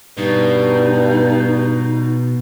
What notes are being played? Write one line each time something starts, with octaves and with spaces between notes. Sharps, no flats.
G2 B2 D#4